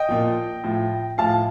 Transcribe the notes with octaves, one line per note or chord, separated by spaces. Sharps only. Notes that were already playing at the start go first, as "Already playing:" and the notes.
Already playing: D#5 G5
A#2 F3
A2 F3
A2 F3 F5 A5